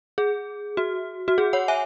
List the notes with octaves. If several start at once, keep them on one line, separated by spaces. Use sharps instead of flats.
G#4
F#4
F#4
G#4
C#5 F#5
E5 G#5